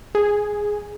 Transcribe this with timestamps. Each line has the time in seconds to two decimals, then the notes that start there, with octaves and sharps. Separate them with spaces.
0.15 G#4